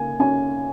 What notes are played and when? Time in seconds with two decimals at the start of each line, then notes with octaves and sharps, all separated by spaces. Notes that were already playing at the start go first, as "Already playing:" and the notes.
Already playing: C#3 A#3 G#5
0.20 C#4 G#5